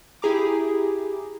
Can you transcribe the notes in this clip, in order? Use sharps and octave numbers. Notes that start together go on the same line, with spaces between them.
E4 G4 G#4 A#5 D6